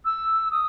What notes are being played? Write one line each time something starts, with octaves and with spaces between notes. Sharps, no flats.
E6
D#6